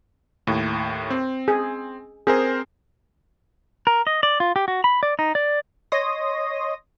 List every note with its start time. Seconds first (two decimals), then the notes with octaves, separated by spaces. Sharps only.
0.47 D#2 A2
1.10 C4
1.48 G#4
2.27 C4 G#4 A#4 C5
3.87 A#4
4.07 D#5
4.23 D5
4.40 F4
4.56 G4
4.68 F#4
4.84 B5
5.03 D5
5.19 D#4
5.35 D5
5.92 C#5 D#5 C6 D#6 A#6